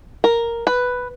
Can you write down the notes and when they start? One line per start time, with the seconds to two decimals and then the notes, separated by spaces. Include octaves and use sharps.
0.24 A#4
0.67 B4